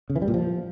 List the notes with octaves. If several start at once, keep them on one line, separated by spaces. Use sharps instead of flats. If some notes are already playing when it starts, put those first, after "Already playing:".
C#3
E3
G3
A#2
F3